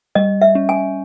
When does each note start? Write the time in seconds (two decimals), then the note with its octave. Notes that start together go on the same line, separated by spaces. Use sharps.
0.15 G3 D#5
0.42 E5
0.55 C#4
0.69 G#5